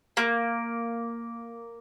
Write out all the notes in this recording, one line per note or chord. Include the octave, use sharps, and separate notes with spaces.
A#3